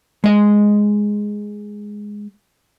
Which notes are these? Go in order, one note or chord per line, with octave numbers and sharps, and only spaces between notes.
G#3 D#5